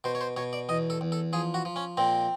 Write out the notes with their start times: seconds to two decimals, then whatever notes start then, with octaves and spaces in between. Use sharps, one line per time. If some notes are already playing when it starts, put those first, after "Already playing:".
0.04 B2 C5
0.15 C#5
0.21 C5
0.37 B2 C#5
0.53 D5
0.69 E2 D#5
0.90 A4
1.01 E2
1.12 A4
1.33 F3 G#4
1.54 F#4
1.65 F3
1.76 C#4
1.97 A#2 C4